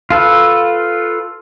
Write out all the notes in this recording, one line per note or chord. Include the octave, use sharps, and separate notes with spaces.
F4 A4 B4